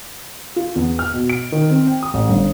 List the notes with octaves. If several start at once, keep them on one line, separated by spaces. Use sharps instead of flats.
F4
E2
F6
B2
D7
D#3
C4
G5
D#6
A1
G1